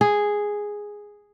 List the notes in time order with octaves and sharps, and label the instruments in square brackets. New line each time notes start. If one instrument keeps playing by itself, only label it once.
[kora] G#4